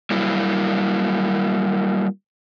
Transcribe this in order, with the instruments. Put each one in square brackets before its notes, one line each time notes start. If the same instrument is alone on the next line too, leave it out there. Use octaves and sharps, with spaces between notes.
[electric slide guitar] F#3 G3 A#3 E4